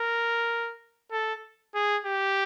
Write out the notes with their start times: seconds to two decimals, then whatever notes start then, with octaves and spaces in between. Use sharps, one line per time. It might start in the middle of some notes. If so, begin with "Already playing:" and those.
Already playing: A#4
1.12 A4
1.75 G#4
2.06 G4